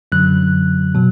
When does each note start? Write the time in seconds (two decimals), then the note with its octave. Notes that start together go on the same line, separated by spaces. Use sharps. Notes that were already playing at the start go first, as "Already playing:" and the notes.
0.12 F#2 D3 F#3 F#6
0.95 B2 F#3